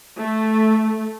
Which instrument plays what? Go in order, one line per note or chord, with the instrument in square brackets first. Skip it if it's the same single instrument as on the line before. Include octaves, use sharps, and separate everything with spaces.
[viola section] A3